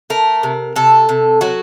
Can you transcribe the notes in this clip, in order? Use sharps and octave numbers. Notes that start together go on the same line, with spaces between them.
A3 A#4
C3
C3 A4
C3
F#3 F#4